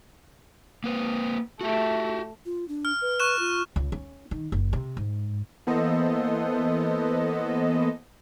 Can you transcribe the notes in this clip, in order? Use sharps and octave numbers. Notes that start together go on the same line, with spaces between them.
A#3 B4 C5
A3 F#4 G4
F4
D4
F6
B4
C#6 F#6 E7
F4
C#2
C#4
D#3
F#1
C3
G#2
E3 A#3 B3 A4 C5 D#5